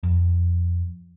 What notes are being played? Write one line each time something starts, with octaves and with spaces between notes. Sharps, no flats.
F2